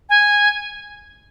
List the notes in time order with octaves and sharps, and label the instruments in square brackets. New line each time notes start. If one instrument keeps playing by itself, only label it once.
[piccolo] G#5